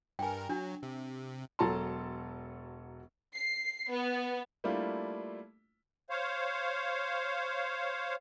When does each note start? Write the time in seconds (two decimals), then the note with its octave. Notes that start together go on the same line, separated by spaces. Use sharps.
0.19 G2 A#4 G5 G#5
0.49 F#3 D4
0.83 C3
1.59 E1 F#3 A4 A5 A#5 C6
3.35 C7
3.93 B3
4.64 G3 A3 A#3 D4 E4 F4
6.10 C5 C#5 F5